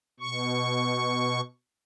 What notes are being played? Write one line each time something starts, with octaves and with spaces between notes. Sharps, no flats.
B2 C#6